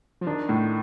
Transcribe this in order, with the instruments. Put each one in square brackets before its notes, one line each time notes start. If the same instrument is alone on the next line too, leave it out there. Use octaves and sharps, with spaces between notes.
[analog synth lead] F3
[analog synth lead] D#3 [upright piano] D4
[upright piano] A2